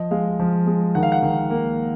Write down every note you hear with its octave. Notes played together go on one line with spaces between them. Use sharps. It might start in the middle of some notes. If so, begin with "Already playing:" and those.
Already playing: F3 D#5
G#3 F5
F3
G#3
D#3 F#5
F5
F#5
D#3
A#3